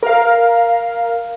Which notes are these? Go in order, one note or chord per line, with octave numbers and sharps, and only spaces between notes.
A#4 F5